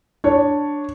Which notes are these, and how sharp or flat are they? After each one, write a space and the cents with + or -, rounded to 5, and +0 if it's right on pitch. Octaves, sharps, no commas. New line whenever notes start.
D4 +0 C#5 +0